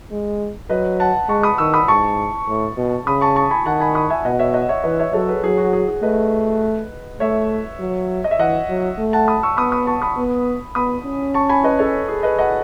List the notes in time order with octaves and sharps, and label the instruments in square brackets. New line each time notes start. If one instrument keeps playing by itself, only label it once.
[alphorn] G#3
[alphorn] F#3 [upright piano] B4 D#5
[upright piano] F#5 A5
[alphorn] G#3 [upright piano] A5 C#6
[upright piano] B5 D#6
[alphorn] D#3 [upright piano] C#6 E6
[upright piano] B5 D#6
[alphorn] G#2 [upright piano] A5 C#6
[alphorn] A2
B2
[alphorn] C#3 [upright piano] B5 D#6
[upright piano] A5 C#6
A5 C#6
G#5 B5
[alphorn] D#3 [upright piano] F#5 A5
[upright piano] G#5 B5
B5 D#6
E5 G#5
[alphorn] B2 [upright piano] D#5 F#5
[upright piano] C#5 E5
D#5 F#5
C#5 E5
[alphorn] E3 [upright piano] B4 D#5
[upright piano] C#5 E5
[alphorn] F#3 [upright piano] A4 C#5
[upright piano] G#4 B4
[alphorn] F#3 [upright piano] G#4
[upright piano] F#4
G#4
G#4
[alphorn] A3 [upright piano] B4 D#5
[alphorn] A3 [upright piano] C#5 E5
[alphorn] F#3
[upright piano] D#5
E5
[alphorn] E3 [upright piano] D#5 F#5
[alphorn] F#3
A3
[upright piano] F#5 A5
B5 D#6
C#6 E6
[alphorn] B3 [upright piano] B5 D#6
[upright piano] B5 D#6
A5 C#6
B5 D#6
[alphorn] B3
[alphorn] B3 [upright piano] B5 D#6
[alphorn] C#4
[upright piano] A5 C#6
G#5 B5
B4 D#5
A4 C#5
G#4
B4 D#5
D#5 F#5